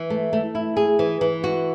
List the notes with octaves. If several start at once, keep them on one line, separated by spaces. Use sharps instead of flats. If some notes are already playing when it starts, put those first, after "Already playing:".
Already playing: E3
A3
A3
E4
G#4
E3
E3
F#4